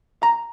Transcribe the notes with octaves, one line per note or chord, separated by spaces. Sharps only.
A#5